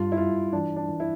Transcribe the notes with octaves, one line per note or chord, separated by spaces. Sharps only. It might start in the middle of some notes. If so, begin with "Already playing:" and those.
Already playing: G2 F4
E4
G2 F4
E3 D4
D4
E3
E4